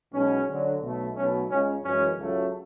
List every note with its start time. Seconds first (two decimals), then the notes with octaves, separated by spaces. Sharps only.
0.12 B1 B2 G#3 C#4
0.47 D2 D3 F#3
0.81 B1 B2 A3
1.15 B1 B2 F#3 A3 C#4
1.49 C#2 C#3 G#3 C#4
1.84 F#2 E3 G#3 C#4
2.17 C#2 C#3 F#3 A3